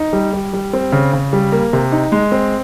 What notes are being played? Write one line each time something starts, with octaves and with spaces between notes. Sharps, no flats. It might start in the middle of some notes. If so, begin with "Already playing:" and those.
Already playing: D#4
G3
G3
G3
C4
C#3
C#3
G3
A#3
C3
D#4
G#3
C4